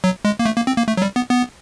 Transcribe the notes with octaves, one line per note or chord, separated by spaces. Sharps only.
F#3
G#3
A#3
A3
A#3
C4
A#3
A3
F#3
G3
B3
B3